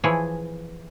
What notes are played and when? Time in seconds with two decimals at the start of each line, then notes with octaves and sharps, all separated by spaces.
0.04 E3 F3 E4 G#4 C#5